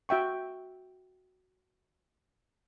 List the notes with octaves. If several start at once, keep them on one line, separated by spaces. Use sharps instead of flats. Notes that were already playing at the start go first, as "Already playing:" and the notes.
F#4 E5 G5 C#6